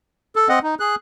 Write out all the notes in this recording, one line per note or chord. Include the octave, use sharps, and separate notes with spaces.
A4
C4 D#5 F#5
D#4
G#4 F#6